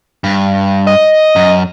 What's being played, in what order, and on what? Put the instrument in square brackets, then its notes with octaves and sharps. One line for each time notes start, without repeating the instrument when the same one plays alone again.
[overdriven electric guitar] G2
[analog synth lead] D#5
[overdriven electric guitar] F#2